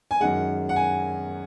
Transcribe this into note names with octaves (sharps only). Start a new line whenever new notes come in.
G#5
F#2 D#3 G#3 F#5
F#5
G#5